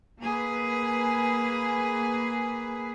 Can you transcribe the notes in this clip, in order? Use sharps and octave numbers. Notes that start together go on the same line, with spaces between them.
A#3 G#4 B4